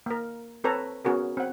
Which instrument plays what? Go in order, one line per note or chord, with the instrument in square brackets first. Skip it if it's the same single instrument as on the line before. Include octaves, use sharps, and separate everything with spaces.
[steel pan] A#3 A#4
C4 A4 B4 C#5 A#5
B3 C#4 F#4 G#4 A#4
C4 F#5